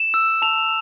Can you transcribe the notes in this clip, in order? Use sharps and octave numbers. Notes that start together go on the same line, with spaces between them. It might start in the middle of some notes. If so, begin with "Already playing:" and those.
Already playing: E7
E6
A5 F7